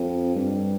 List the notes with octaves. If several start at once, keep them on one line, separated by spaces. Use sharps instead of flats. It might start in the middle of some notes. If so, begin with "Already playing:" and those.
Already playing: F2
G2